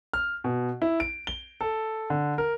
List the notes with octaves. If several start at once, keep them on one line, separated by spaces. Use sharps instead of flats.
F6
B2
E4
D7
G7
A4
D3
A#4